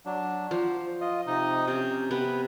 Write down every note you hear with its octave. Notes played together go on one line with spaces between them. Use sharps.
F#3 D4
F3 C5
F4 D#5
C3 D#4 D#5
C3 C#4 G6
C3 B3 B4